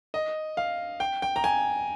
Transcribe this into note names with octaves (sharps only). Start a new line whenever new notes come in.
D#5
F5
G5
G5
A#5
G#5